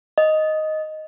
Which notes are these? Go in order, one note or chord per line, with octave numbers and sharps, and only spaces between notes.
D#5